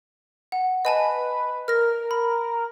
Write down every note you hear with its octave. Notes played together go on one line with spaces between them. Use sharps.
F#5
B4 D#5 G#5 A5
A#4 F6 A#6
B5